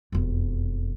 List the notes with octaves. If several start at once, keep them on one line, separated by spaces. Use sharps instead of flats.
E1 F2